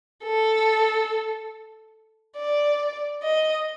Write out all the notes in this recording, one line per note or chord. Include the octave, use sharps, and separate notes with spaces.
A4
D5
D#5